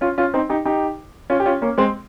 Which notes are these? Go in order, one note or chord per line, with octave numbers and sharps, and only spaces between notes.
C#4 F4
C#4 F4
C4 D#4
D#4 G4
D#4 G4
C#4 F4
G4
C#4 F4
A#3 C#4
G#3 C4